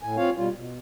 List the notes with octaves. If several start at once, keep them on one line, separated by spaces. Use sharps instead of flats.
A2 G#5
C4 F4 C#5 F5
B2 G3 F4
B2